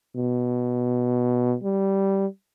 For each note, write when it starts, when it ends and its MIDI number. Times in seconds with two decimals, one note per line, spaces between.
0.15 1.56 47
1.63 2.26 55